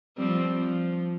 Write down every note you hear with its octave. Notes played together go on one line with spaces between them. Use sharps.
F3 G3 C4
F3